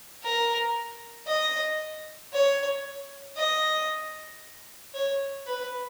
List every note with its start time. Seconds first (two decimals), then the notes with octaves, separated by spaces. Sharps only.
0.23 A#4
1.27 D#5
2.33 C#5
3.37 D#5
4.94 C#5
5.47 B4